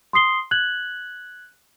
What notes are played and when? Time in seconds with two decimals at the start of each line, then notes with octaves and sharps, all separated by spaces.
0.13 C6 D#6 C7 G7
0.51 F#6 G#6 F#7